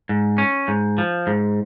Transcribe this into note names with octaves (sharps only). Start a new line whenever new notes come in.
G#2
C#4
G#2
F3
G#2